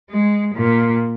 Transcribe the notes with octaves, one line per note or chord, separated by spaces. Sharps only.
G#3
A#2